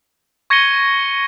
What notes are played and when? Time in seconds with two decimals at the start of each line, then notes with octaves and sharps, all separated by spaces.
0.50 C#6 G#6 A#6 C#7 D#7 G7